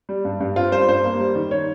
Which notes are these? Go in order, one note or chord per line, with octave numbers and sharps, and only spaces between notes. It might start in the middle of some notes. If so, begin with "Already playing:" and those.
G3
G2
G2
C4 F4
G3 C5
G2 C5
A#3
G3
D#3
C#5